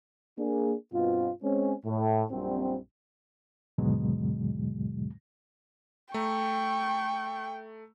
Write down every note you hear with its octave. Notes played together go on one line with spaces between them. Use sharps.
A#3 D4 G#4
G2 B2 C4 F4
G#3 C4 C#4
A2
A#1 F#2 G3 C4
D#2 G#2 B2 D3 F#3 G#3
A3 G5 A#5 C#6